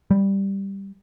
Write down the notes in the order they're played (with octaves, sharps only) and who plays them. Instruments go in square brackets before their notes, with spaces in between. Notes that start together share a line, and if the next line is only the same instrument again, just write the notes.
[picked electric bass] G3